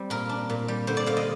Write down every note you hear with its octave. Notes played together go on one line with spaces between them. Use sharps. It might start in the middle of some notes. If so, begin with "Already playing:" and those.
Already playing: G3 C4
A#2 A#4
D4
A#2
G3
D3 C5
D5
D3 F5
D#5